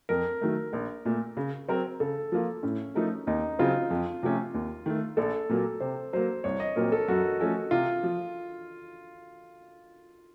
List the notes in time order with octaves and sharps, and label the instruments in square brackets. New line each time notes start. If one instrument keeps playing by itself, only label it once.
[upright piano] F2 [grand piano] A#4
[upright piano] D#3 F#3 A3
A#1
A#2 A3
C#3
F#3 C4 F#4 A#4
[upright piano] C#3 [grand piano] A4
[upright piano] F3 A#3 F4
[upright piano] A2 [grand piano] C#4
[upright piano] F3 A3 D#4 A#4
[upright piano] D#2 [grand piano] D#4
[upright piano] C#3 F#3 C4 [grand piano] F4
[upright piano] F2
C3 F3 A3 C#4
D#2
D#3 A3
[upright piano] A#1 [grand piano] A4
[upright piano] A#2 F#3 A#3
[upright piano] C3 [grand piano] C5
[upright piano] F#3 A#3 [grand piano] C5
[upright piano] C2 [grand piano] C#5
[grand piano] D#5
[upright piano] A#2 F#3 C4 [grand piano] A#4
[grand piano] A4
[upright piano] F#2 [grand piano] F#4
[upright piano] F3 A3 C#4 A4
[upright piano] C3 [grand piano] F4
[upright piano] F3